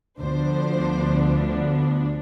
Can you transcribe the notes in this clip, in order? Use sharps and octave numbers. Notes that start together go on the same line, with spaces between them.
D2 D3 F3 B3 D4 C5